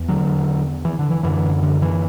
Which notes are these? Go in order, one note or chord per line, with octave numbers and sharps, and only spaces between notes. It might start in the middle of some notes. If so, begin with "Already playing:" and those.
Already playing: E2
D3 F#3
E3
D3
E3
F#2 D3 E3
D3
E3